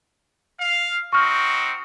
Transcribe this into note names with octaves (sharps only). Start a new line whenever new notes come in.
F5
C4 D#4 F#4 C#6 F6